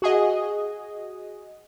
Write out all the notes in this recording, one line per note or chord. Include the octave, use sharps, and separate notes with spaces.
F#4 G#4 D#5